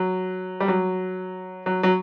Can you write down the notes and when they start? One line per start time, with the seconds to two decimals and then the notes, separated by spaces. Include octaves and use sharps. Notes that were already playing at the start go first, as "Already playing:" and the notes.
Already playing: F#3
0.60 G3
0.68 F#3
1.66 F#3
1.83 F#3